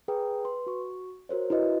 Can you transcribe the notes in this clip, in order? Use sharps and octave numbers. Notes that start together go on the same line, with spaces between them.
G#4 B4 G5 A#5 D#6
B4 C6
F#4 C#6
F#4 A#4 C5 C#5
E4 F#4 B4 D#5 E5